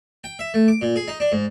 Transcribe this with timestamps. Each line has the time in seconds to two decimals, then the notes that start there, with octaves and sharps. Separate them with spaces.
0.24 G5
0.39 E5
0.54 A3
0.68 D6
0.82 A#2
0.96 G#4
1.08 D#4
1.20 D4
1.32 G#2